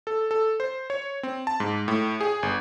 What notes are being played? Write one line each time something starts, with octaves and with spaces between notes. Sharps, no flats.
A4
A4
C5
C#5
C4
A5
G#2
A2
G#4
G1